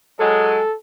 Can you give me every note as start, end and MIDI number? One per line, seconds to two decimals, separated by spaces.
0.20 0.59 54
0.20 0.59 56
0.20 0.76 69